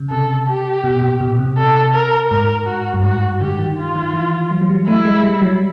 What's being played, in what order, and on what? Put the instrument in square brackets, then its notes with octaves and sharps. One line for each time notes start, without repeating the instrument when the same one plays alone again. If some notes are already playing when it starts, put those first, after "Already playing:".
Already playing: [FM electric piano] C#3
[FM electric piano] C3 [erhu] A4
[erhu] G4
[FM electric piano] B2
A#2
B2
C3
[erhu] A4
A#4
[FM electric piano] G#2 [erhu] A#4
[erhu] F#4
[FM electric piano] G2
[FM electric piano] G#2 [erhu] F#4
[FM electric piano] D3 [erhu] G4
[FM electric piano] D#3
[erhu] F4
[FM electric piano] D#3
E3
F#3
F#3
G3
[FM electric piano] A3 [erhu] E4
[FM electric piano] G#3
G3
F#3